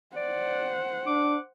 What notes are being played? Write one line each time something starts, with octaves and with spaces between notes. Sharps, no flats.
C5 D5 F#5
D4 D6